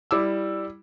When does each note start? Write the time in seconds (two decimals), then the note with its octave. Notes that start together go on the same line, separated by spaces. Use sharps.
0.11 G3 E4 D6 E6